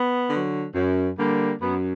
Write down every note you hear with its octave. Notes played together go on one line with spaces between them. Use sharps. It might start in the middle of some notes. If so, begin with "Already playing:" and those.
Already playing: B3
D3 F#3
F#2
D3 G3 A#3
F#2 B3